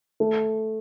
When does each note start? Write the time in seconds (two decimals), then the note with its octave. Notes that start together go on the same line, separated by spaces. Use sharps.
0.20 A3